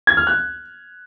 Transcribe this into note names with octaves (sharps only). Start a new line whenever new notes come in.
G#6
F6
F#6